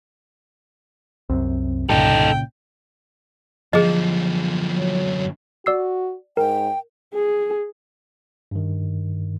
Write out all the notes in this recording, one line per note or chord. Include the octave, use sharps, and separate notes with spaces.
C2 F#2 C3 C4
C2 G2 A#2 C#3 D#4 A4 G5
F#2 D3 F3 G#4 D#5
F#3
F#4 D5 E6 C7
G#2 A#4 G5
G#4
G2 D#3